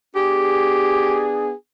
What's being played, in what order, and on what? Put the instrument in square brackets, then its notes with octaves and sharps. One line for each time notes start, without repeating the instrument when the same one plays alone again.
[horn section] B3 D4 G#4 [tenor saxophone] G4